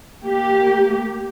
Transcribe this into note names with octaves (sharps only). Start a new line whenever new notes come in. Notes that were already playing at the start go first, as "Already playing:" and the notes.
A#3 G4